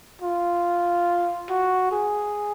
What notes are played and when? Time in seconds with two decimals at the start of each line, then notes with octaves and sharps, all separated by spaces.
0.22 F4
1.49 F#4
1.92 G#4